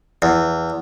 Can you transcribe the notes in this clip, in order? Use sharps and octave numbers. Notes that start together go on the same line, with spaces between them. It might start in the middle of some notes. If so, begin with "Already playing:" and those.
E2